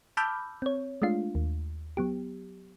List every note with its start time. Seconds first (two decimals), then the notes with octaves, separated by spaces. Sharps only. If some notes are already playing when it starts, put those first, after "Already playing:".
0.17 A5 B5 D6 E6 F6 G6
0.62 C4 C#5
1.02 G#3 A3 D4 F4 F5
1.35 D#2
1.97 F#3 B3 G4